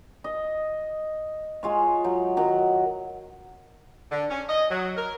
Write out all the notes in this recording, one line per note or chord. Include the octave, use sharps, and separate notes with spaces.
D#5
G#3 F4 C#5
F#3
D#3 F#3
D3
C#4
D#5
F#3
A#4